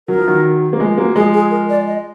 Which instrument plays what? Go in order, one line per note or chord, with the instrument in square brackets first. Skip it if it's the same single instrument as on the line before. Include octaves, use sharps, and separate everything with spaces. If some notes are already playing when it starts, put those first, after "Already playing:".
[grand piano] F#3 [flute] A#4
[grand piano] F3
D#3 F#3
A#3
F3 G#3
F#3 A#3
[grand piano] F3 G#3 [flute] G#4
[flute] G#4
A#4
D5
D#5